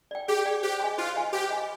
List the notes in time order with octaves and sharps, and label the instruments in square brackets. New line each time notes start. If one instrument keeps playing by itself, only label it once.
[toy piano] D5 G5
[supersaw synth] G4 [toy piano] G#4
[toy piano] D5 G5
[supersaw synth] G4 [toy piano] C5
[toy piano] D#5 G#5 C6
[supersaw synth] F4 [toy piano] C5
[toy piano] D#5 G#5 C6
[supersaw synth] G4 [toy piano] C5
[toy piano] D#5 G#5 C6